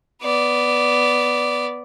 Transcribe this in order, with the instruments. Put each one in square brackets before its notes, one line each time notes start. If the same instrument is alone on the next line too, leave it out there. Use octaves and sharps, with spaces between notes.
[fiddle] B3 D5